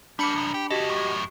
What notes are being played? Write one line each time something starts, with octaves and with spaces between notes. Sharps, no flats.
G3 A#3 D4 B5 C#7
C2 F#2
G4
C#3 F#4 G4 A4 D#5
F#2 A2